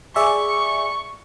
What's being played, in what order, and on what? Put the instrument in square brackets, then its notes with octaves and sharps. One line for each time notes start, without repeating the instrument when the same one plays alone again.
[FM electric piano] G#4 D5 E5 [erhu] C#6